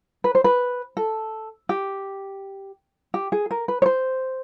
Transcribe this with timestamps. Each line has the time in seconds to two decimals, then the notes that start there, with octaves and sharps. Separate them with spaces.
0.24 B4
0.35 C5
0.44 B4
0.97 A4
1.69 G4
3.14 G4
3.32 G#4
3.51 A#4
3.68 B4
3.82 C#5
3.86 C5